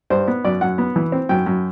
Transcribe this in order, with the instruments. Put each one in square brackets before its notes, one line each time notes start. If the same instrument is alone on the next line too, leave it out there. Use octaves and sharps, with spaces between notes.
[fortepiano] G2 C5
B3
F#2 D5
F#2 F#5
B3
E3
C4
F#2 G5
F#2